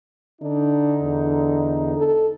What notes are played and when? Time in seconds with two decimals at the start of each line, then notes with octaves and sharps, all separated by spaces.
0.42 D3 D4 D#4
1.03 E2
1.97 A4